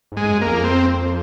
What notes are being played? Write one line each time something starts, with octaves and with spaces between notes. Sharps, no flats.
G#2
G#3
G#2
F#2
A#3
F2
C4